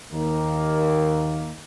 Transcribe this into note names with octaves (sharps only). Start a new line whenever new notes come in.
D#2 D#3 A#3